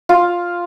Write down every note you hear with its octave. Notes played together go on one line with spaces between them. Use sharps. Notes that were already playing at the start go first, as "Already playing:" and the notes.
F4